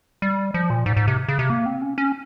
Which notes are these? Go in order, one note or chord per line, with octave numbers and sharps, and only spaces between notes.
G3
F3
A#2
G#2
G#2
C3
C#3
C3
A#3
C4
C#4
C#4